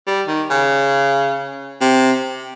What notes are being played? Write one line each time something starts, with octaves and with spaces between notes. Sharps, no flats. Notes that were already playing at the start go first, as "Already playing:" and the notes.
G3
D#3
C#3
C3